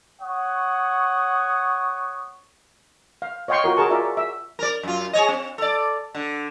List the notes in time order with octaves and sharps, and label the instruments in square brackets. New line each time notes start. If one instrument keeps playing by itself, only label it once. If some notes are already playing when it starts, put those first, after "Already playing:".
[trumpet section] C#5 F#5 C#6 D#6
[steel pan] F5
C#5 D#5 F5 G5 C6 C#6
F4 F#4 A#4
F#4 G#4 A#4 A5 C#6
F4 A#4 D5 E5
E5
[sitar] A#4 D5
F#2 F4
G#4 C#5 D#5
C4
A4 D5
D3